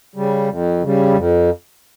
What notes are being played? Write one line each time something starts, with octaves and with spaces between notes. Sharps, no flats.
C#3 G3
F2
C#3 G3
F2